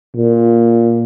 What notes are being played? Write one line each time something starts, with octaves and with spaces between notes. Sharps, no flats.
A#2